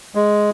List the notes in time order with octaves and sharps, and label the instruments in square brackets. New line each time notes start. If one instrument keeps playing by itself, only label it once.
[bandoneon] G#3